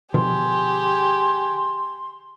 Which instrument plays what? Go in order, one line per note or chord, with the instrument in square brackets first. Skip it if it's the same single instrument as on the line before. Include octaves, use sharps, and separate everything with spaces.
[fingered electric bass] B2 D3 F3 [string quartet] G4 G#4 [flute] C6